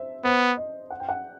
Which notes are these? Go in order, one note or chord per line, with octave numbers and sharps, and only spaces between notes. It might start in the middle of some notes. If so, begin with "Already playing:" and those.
Already playing: C5 E5
B3 C5
D#5
F#5
G5
F#5